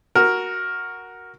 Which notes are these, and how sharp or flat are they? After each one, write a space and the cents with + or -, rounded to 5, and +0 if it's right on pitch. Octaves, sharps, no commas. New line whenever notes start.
F#4 +0 A#4 +5